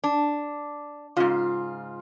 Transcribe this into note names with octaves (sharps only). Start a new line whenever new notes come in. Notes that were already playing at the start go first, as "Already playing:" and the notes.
D4
G#2 C#3 F4